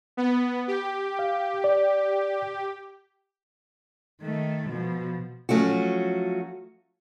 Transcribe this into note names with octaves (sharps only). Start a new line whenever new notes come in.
B3
G4
F5
D5
D#3 A3
B2 F3
F3 F#3 A3 C#4 F#4